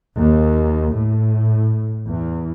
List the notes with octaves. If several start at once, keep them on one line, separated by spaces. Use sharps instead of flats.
D#2
A2
E2